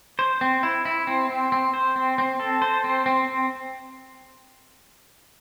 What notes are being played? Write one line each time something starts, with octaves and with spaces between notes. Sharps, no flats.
C5
C4
E4
E4
C4
C4
C4
C5
C4
C4
A4
C5
C4
C4